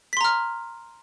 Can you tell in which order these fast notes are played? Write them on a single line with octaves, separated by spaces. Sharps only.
B6 C6 A#5 F6